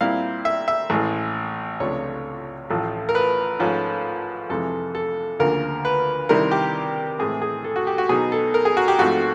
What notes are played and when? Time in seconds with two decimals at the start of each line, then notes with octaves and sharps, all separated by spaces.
0.01 A#2 G3 C4 E4 F5
0.45 E5
0.68 E5
0.90 A1 A2 E3 G#3
1.80 C#2 C3 F3 A3 D4 C#5
2.70 A1 A2 F3 A3
3.09 A#4
3.15 B4
3.59 G#2 F3 A3 C#4
4.50 F2 C3 E3 G#3 A4
4.95 A4
5.40 D2 C#3 F3 A#3 A#4
5.85 B4
6.29 C3 D#3 G3 C4 E4 A#4
6.51 G4
7.19 A2 E3 G#3 C4 G#4
7.42 G#4
7.64 A4
7.76 F#4
7.87 G4
7.98 F#4
8.09 B2 F#3 B3 D#4 G#4
8.32 A4
8.54 A#4
8.65 G#4
8.77 F#4
8.88 G4
8.99 G#2 F3 A3 C4 F#4